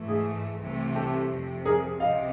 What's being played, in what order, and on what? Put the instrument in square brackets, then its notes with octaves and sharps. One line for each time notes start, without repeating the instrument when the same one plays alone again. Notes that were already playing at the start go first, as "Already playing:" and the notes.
Already playing: [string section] G#2 E3 A3
[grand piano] G#4
[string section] C2 C3 E3 A3
[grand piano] G4 A4
[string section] F2 C3 F3
[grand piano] G#4 A#4
[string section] C#2 C3 [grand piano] D#5 F5